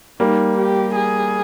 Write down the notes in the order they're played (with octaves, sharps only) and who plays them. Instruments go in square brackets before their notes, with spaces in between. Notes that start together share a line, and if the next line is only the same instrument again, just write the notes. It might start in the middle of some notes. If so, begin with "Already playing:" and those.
[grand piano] G3 A#3 [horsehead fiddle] D#4
[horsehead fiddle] G4
G#4